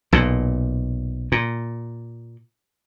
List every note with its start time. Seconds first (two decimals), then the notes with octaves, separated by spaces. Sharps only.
0.12 B1 A#2
1.32 A#2